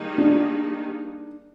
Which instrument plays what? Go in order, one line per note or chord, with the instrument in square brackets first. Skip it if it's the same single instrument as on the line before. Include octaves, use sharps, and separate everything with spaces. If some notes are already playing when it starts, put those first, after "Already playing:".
Already playing: [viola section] D#3 G3 A#3 D#4 G#4
[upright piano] D4